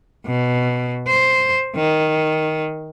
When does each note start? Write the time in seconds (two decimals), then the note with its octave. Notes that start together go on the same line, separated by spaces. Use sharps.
0.26 B2
1.07 C5
1.76 D#3